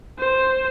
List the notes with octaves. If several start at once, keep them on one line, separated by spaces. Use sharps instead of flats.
C5